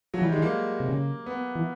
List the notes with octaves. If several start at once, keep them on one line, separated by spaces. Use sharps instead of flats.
F3 F#3
E3 G3
D#3 G#3
E3
A#3
C3
C#3
B3
E3